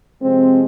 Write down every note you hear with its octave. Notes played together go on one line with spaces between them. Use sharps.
C3 F3 G#3 C4